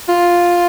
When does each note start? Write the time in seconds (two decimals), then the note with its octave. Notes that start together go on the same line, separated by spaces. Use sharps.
0.09 F4